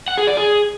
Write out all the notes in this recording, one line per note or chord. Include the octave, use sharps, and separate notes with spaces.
F#5
G#4
D5
G#4